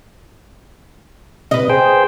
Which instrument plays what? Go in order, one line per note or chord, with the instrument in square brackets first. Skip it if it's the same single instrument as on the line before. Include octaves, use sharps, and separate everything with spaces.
[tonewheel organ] C3 [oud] B4 D#5
[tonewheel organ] G#4 C5 G5